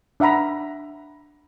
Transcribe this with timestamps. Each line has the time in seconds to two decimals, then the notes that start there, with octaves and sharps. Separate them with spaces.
0.20 D4 E5 F#5 A#5 B5